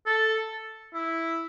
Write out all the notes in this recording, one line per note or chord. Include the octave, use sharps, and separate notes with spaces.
A4
E4